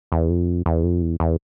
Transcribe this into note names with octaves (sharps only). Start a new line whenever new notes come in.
E2
F2
E2
F2
E2
E2